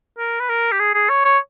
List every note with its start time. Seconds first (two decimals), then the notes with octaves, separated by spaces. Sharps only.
0.18 A#4
0.40 B4
0.49 A#4
0.72 G4
0.80 G#4
0.94 G#4
1.09 C#5
1.25 C#5